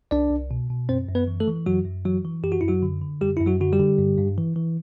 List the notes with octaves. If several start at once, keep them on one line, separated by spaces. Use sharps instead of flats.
C2 D4 D5
C2
B2
B2
F#2 C4 C5
F#2
B3 B4
E3
A3 A4
E3
F#2 F#3 F#4
F#2
E3 F#3 F#4
E3
F#2 G4
F#4
F#2 E4
F#3 F#4
D3
D3
F#2 G3 G4
F#2 E4
F#3 F#4
D3 F#4
G3 G4
D3
G2
G2
E3
E3